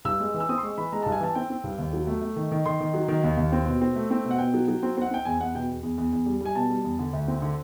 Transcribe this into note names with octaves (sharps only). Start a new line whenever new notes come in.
G2 E6
G#3
E3
E6
C4 D#6
C6
G#3 C#6
E3 B5
G#3 A#5
G2 A5
G#5
E3 A5
C4 G5
C4
G2
D#2
F#3
A3
A3
D#3
D#3
D#3 C6
D#3
F#3
D#3
D#2
D#2
C4
B2
C4
A3
C4
B2
F#5
B2 G5
F#3
F#3
C4
C4 F#5
C4 G5
E2 G#5
E2 F#5
B2 G5
E2
E2
E2
E2
G3
G3 G#5
B2 A5
G3
E2
D3
D2
C4
D3